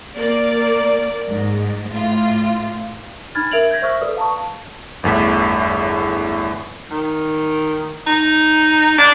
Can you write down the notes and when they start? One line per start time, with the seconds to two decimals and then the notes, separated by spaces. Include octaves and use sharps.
0.15 A#3 D5
1.29 G#2
1.92 A2 F4
3.35 D4 D#4 B5 F6 G#6 A6
3.51 A#4 E5 G#6 D7 F7 F#7
3.71 G6 G#6 A#6 B6
3.82 C5 E5 C#6 E6 F6
4.01 A4 B4 D5 D#6
4.17 F5 A5 A#5 C#6
5.03 G1 E2 A2 B6
6.91 D#3
8.06 D#4
8.98 D4